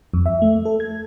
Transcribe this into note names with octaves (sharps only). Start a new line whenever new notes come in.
F2
E5
A3
A4
G#6